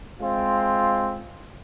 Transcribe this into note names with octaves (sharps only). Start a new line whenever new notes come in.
G#3 C4 F4